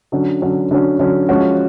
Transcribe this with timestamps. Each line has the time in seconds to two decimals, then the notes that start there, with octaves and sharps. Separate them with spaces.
0.12 D3 F#3 C#4
0.42 D3 F#3 C#4
0.71 D3 F#3 C#4
0.99 D3 F#3 C#4
1.29 F3 G#3 C#4 F#4